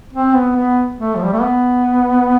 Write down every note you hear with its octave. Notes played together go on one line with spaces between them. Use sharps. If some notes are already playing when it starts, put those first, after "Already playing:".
C4
B3
B3
A3
F3
G3
A3
B3